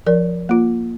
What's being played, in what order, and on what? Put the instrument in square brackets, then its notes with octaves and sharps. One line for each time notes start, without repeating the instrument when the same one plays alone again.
[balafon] F3 A#4 D5
A#3 F4